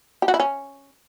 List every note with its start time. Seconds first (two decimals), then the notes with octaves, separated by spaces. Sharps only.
0.22 G4
0.28 F#4
0.34 E4
0.40 C#4